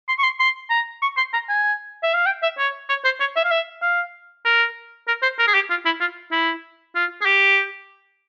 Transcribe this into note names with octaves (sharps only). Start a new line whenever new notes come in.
C6
C#6
C6
C6
A#5
C#6
C6
A#5
G#5
E5
F5
G5
E5
C#5
C#5
C5
C#5
E5
F5
E5
F5
A#4
A#4
C5
A#4
G#4
G4
F4
E4
F4
E4
F4
G#4
G4